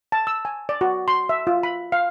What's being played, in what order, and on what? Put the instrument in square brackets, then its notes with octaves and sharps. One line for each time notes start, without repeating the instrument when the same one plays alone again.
[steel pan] A5
E6
G#5
D5
F#4
C6
E5
F4
B5
F5